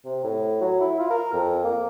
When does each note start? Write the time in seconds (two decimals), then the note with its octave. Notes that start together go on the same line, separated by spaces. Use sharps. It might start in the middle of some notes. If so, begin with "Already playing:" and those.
0.05 C3
0.24 A2
0.61 F#3
0.81 E4
0.99 F4
1.10 A#4
1.33 F2
1.64 A#3